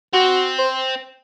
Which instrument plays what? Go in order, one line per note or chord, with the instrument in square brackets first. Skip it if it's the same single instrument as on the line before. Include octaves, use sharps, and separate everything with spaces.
[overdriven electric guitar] C4 [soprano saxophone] F#4
[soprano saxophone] C5